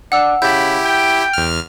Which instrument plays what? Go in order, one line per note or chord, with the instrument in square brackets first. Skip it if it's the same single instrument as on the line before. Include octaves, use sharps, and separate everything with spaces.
[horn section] D4 [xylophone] F#5 E6
[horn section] C#3 A5 B5 [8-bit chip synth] E4 G4 [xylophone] G6
[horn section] G5
[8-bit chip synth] E2 F6